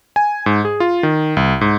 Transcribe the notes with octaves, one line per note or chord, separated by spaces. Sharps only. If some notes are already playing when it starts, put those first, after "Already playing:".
G#5
G#2
G#4
F4
D#3
C2
G#2